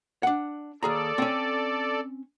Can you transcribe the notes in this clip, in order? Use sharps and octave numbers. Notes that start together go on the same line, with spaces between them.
D4 F#5
D#2 G#4 A4 D5 A#5
C4 C#4